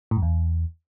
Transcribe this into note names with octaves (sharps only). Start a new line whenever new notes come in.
A2
F#2
E2